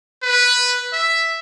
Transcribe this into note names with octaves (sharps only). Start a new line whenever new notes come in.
B4
E5